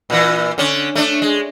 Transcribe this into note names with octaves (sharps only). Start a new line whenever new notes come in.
A#2 E3
D3 C#4
A3 D4
G#3